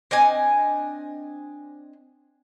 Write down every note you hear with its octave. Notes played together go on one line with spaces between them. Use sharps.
C4 D4 D#5 G#5